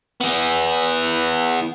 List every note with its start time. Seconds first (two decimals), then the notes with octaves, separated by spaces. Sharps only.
0.20 E3 B3